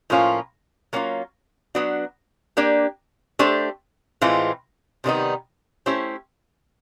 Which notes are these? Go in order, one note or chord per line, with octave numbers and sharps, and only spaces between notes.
A2 F3 A#3 C#4 F4
F#3 A#3 C#4 F4
F#3 B3 D4 F#4
A#3 D4 G4
A3 D4 G4 C5
A2 E3 G#3 C4 F4
C3 D#3 G3 B3 D#4
A3 C#4 E4 G4 C5